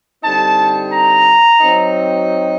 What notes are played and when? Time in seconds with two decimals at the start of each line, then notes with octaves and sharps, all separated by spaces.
0.22 D3 G3 C4 D#4 A5
0.91 A#5
1.60 F#3 C4 D#4